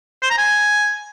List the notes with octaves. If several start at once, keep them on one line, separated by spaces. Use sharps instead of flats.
C5
A#5
G#5